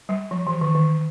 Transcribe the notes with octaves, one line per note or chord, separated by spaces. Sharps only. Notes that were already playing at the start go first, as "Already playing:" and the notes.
G3
F3
E3
D#3
D#3